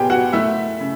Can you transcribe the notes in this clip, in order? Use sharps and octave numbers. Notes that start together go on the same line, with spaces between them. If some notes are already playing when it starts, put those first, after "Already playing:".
Already playing: A#2 B3 G4 G#4 G5
F#4 F#5
A3 E4 E5
C#3